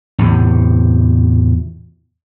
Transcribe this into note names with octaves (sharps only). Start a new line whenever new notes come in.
E2 A2 C3